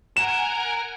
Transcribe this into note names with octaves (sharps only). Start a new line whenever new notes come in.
A#4 F#5 G#5 D7 E7